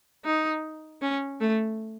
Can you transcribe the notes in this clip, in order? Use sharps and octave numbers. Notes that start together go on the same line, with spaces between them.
D#4
C#4
A3